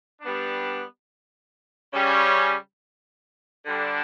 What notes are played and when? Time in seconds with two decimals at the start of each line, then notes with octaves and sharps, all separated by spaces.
0.22 G3 B3 D4
1.94 C#3 G3 C#4
3.66 D3 G3 D4